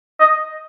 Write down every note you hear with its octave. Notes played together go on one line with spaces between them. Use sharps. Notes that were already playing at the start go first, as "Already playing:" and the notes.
D#5